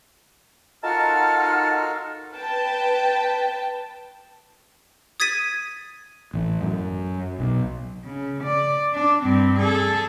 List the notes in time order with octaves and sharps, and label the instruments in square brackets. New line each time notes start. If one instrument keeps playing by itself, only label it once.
[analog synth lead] D#4 [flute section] F4 F#5 F6 [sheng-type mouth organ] F#4 A4 A#4 [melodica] A5
[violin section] B4 G5 A5
[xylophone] D#6 G#6 A6 B6 D#7
[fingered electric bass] A1
F#2
B1
[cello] C#3
D5
D4
G2 C4
G#4 A4